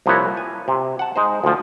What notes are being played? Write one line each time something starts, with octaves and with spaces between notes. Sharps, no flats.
C2 F3 A#3 E4 B4 C#5
G#5
C3
F#5 A5
G#3 D#4 C5
D2 F3